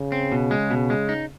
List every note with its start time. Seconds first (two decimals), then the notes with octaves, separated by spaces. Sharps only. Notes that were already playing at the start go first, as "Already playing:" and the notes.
Already playing: C#3
0.12 C4
0.32 B2
0.51 G#3
0.71 B2
0.90 G#3
1.09 D#4